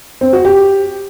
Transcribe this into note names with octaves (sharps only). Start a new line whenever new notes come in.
C4
F#4
G4